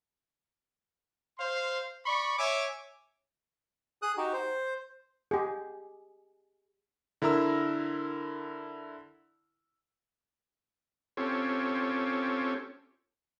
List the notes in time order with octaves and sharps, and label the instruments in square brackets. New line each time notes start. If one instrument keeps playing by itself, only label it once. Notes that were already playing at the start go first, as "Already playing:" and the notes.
[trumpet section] C5 F5 C6
D5 B5 C#6
C#5 E5 G#5 D6
[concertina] G#4 D#6 F#6
D#4 F#4 G4
C5
[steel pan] G4 G#4
[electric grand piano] D3 E4 A#4 A#5 E6
[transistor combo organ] C4 C#4 F4 G4 A4 C#5